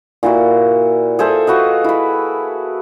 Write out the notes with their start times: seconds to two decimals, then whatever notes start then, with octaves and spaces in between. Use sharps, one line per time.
0.23 A#2 E4 F#4
1.19 G#4 A4 C5 E5
1.47 F4 F#4 B4 D#5
1.84 E4 B5